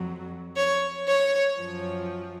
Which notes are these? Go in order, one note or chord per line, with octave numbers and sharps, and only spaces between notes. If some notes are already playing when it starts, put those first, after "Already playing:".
Already playing: F2 F#3
C#5
C#5
F#2 F3